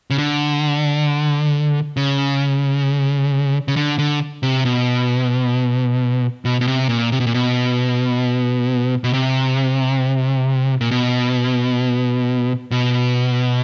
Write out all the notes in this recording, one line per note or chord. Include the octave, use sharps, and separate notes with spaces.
C#3
D3
C#3
C#3
D3
D3
C3
B2
B2
B2
C3
A#2
C3
B2
A#2
B2
B2
C3
A#2
B2
B2